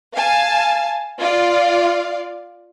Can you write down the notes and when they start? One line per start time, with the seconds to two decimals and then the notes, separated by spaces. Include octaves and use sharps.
0.14 F5 G#5 A5
1.18 F4 D5 F5